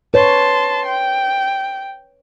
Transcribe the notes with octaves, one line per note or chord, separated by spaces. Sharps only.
B4 C#5 A5 C6
G5